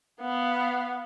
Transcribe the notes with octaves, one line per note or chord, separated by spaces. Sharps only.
B3 F5